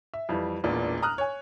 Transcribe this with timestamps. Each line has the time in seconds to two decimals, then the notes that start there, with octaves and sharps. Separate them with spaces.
0.14 E5
0.29 F2 E3 G3
0.64 E1 A1 A#2 B3 D4
1.03 A#5 D#6 F6 F#6
1.18 C#5 G#5